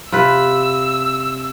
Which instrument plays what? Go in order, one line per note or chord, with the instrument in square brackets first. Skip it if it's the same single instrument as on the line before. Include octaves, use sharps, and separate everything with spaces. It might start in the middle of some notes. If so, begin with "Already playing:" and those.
[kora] C3 F4 B4 [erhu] E6